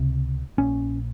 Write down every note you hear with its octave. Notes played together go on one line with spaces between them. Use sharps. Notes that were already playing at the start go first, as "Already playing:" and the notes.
Already playing: C#2 C3
A#1 A#2 C#4